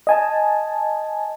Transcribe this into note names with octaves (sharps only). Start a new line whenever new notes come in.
D#5 G#5 A5